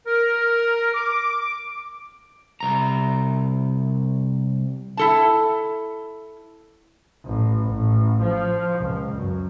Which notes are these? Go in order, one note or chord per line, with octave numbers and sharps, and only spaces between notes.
A#4
D6
C2 A#5
E4 A4 A5
A1
A1
F3
C#2
F#2